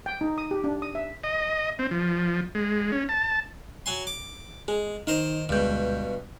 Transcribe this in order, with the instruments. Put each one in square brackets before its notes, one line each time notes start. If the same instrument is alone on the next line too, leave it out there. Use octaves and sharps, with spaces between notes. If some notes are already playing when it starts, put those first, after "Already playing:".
[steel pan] G5
D#4
D#6
G4
D4
D#6
E5
[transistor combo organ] D#5
C4
F3
G#3
C#4
A5
[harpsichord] F#3 G#5 C6
D6
[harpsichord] G#3 [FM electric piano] G#4
[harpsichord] D#3 C5 A#5 [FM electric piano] D#4
[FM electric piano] D2 G#3 G6 [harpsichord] G2 B2